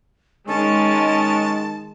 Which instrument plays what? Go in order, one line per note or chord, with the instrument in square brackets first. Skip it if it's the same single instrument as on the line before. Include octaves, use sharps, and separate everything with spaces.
[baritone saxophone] D#3 [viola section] G#3 [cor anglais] C#4 [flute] A5